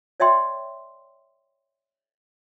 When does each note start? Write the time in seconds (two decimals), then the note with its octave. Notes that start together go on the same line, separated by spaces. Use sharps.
0.20 C#5 D5 E5 G5 C6